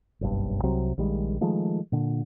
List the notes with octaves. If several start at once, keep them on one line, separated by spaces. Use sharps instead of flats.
F#1 B1 G2
C2 C3 F#3 C4
A#1 D#3 G3 G#3
D#3 F3 G#3 A3
A#2 D3